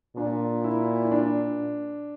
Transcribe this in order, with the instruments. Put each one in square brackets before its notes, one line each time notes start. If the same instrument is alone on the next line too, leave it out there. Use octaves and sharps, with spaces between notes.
[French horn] A#2 [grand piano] D4
[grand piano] E4
E4
D4